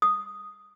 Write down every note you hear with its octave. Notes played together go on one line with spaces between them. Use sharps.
D#6